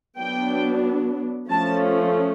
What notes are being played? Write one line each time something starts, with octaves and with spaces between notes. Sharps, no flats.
F#3 B3 D4 G5
F3 A3 C#4 A5